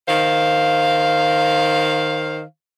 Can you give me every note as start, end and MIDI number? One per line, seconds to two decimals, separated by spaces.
0.07 2.42 51
0.07 2.42 72
0.07 2.42 77